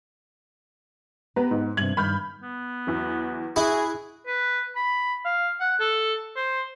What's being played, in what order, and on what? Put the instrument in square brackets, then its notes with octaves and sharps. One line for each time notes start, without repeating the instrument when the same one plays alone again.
[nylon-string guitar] B3 G4 [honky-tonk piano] B4 A#5
[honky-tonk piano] G#2
[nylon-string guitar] G2 C3 [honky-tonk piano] G#6 F#7
[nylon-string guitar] G2 D#3 [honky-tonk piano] B5 F6 G6
[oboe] B3
[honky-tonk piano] E2 E3 F#3
[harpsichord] E4 [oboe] F#4 [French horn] G#4 [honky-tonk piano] D#6
[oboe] B4
B5
F5
F#5
A4
C5